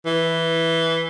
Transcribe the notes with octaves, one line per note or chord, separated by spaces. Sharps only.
E3